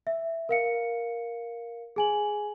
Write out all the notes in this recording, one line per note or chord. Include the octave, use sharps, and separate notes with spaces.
E5
A#4 F5 C#7
G#4 G#5 F#7